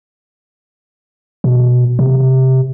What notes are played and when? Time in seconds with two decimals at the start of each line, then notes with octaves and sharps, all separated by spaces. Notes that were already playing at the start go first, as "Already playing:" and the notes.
1.44 B2
1.99 C3